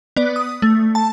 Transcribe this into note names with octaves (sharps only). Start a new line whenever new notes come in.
B3 D5
D#6
A3
A5